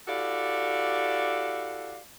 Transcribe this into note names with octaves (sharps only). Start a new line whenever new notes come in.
E4 F#4 G4 A4 D5 F5